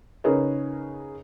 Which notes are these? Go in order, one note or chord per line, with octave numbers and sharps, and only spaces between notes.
C#3 D#4 G#4 A#4 B4 C#5